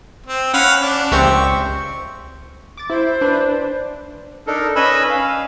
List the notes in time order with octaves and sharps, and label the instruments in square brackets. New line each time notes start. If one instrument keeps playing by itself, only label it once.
[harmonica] C4
[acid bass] C#4 [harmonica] F5 F#5 B5
[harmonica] D4
[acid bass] C#2 [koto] C4 G4 E5 [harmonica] C#6
[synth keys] D6 A6
[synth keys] E4 [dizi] C5
[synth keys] D4 B4
[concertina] D4 D#4 A4 A#4
C#4 B4 D#5 G#5 B5 E6
F5